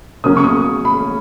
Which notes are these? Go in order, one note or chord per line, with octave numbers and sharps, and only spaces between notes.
C#3 F#3 A#3 C#4 D#6
C#6
D#6
B5